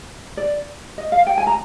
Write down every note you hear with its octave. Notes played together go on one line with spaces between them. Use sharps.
D5
D#5
F5
G5
G#5
A#5